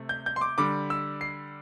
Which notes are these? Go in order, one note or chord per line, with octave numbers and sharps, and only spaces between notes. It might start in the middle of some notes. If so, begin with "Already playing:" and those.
Already playing: C3 A3
G6
G6
C6
D6
D3 G3 D6
E6
C7